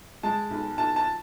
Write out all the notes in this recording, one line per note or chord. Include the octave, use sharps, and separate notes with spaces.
G#3 A5
B1
B1 A5
A5